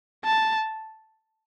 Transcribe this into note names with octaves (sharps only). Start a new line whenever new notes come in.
A5